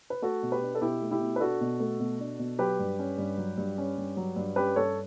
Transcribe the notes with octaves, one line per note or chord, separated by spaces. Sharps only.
B4
A3 F#4 A4
B2
G4 B4
D4
A4
B2 E4 G4
A3
E4 G4
B2
B4
D4 F#4 A4
B2
A3
B2
D4
B2
F#3 G4 B4
G2
C#4
G2
F#3
G2
C#4
G2
F#3
G2
C#4 G4 B4
G2 A4 C#5